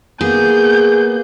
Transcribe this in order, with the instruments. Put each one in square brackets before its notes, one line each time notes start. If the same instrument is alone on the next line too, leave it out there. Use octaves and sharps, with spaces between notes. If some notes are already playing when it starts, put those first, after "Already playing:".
[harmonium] A#3 B3 [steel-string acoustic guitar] G#4 [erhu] G6